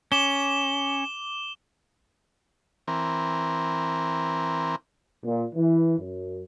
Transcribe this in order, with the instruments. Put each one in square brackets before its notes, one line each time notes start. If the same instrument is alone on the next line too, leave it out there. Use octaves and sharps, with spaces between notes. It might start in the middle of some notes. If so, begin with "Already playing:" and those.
[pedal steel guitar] C#4 [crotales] D6 E7 G7
[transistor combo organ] E3 C4 A#4
[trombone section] A#2
E3
F#2